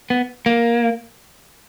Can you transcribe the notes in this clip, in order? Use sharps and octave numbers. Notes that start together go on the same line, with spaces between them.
B3
A#3